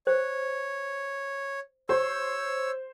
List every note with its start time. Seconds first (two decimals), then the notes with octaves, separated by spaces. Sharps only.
0.07 C5 C#5
1.89 G4 C5 C#5 E6